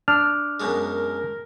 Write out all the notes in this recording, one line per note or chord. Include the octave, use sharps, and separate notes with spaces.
D4 F6
F#2 B2 G#3 A#4